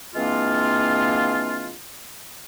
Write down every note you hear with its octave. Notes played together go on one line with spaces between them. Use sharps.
E3 G#3 A#3 C4 D4 F4